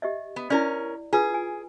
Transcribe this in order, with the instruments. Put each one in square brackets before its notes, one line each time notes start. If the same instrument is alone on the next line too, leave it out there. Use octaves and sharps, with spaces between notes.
[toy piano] G4 D#5 E5
[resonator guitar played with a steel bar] B3
[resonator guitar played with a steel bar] C#4 A#4 [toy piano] E4 D5
[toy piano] F4 B4 [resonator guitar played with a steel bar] G#4
[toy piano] G#5